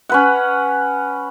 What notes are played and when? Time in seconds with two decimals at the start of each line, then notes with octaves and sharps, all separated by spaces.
0.09 C#4 B4 F#5